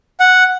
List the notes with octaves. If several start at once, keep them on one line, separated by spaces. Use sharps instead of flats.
F#5